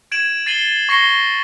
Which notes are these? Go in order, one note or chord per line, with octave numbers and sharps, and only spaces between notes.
G#6 D7 E7 F#7
A6 C7 D#7 F#7 G7
C#6 A#6 C7 C#7 G7